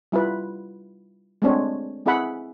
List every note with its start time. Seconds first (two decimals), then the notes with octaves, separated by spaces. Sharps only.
0.12 G3 E4 F4 B4
1.42 G#3 A3 C4 D4 C#5
2.06 C4 E4 G#4 E5 F#5 B5